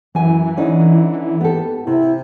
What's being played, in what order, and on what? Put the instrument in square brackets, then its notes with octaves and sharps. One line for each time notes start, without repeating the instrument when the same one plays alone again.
[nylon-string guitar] F#2 G#5 [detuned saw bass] E3
[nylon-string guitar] D3 C#4 D#4
B3 G4 A4
[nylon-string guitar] C3 [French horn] E4